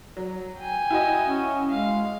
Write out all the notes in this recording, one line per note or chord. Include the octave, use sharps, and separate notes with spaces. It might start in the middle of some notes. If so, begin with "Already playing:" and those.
F#3
G5 G#5
E4 F#4 D#5
C#4
G#3 F5